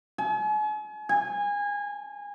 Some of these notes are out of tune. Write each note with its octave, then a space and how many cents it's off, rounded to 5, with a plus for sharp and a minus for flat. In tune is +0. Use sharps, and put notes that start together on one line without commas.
G#5 +40
G#5 -25